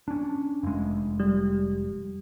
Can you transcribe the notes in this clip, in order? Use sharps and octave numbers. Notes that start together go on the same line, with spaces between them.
C#4 D4
F1 G#3
G3